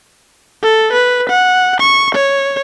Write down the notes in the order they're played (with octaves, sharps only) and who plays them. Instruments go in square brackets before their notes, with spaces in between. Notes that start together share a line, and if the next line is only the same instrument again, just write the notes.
[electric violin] A4
B4
F#5
C#6
C#5